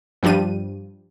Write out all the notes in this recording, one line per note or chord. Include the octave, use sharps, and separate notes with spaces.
G2 F3 G3 D4 D#7